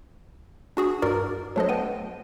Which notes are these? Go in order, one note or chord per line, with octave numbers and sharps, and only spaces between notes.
D4 F#4 G#4
G2 F#4 A#4 D5 A#5 D6
F#3 A3 D4 A4 C5 D#5
B3 B4 G5 D#7